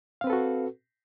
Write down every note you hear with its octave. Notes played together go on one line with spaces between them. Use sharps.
C4 F#4 A4 B4 F5